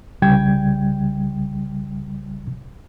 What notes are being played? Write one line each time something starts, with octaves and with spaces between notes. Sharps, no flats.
C2 C#3 G3 G5 G#6